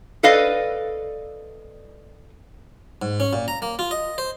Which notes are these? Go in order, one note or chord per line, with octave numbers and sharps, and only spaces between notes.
A4 B4 D5 D#5 F5
G#2
C#4
A#2
A#5
A#3
F4
D#5
C5